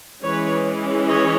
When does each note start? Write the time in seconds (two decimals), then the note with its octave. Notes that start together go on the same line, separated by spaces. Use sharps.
0.22 E3 G#3 C#4 B4 C#5
1.07 C#5 D#5